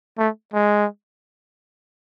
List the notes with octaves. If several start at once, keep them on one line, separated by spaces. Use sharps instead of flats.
A3
G#3